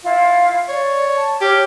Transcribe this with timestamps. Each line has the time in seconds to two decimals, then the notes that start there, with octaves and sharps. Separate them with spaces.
0.03 E4 F4
0.68 C#5 D5
1.16 A5
1.41 G4 C#5 D6 F6